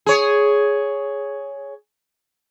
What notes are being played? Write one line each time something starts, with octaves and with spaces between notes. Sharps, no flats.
G#4 C#5